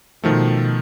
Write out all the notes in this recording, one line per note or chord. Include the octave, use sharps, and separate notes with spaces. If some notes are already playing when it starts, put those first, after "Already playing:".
B2 D#3 F3 A3